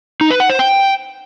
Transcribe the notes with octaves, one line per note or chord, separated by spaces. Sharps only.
D#4
B4
F#5
C5
G5